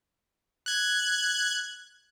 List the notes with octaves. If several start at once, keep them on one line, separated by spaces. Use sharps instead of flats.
F#6 G#6